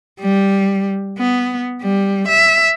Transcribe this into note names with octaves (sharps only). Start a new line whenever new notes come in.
G3
B3
G3
E5